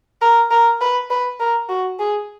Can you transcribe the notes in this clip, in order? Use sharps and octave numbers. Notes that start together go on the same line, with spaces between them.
A#4
A#4
B4
B4
A#4
F#4
G#4